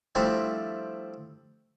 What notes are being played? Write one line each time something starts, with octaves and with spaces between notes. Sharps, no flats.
F3 G3 A3 C4 D4 E4